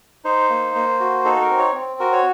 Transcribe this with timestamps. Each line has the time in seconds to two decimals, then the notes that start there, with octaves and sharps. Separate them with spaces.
0.25 D#4 C5
0.50 A#3
0.75 A#3
1.00 F#4
1.25 D#4 A4
1.42 A#4
1.50 C4
1.58 C#5
1.75 C4
2.00 F#4 A#4
2.12 C#5